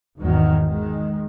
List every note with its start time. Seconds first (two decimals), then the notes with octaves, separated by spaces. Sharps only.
0.18 G#1 E2 D#3 F#3
0.65 D#3 G#3